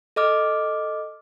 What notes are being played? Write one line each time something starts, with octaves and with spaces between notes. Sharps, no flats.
A4 D#5 D6 F6